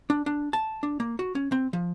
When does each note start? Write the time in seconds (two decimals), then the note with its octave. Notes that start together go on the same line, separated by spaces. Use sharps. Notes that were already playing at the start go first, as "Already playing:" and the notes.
0.10 D4
0.26 D4
0.53 A5
0.83 D4
1.00 A#3
1.19 F#4
1.35 C#4
1.52 C4
1.73 F3